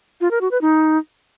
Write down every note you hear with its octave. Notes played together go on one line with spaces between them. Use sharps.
F4
A#4
F#4
B4
D#4